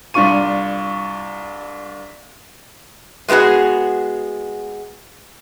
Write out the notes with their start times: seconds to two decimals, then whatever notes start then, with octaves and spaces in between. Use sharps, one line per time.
0.14 C2 D4 F4 C#6 D#7
3.28 G#3 A3 B3 F#4 G#4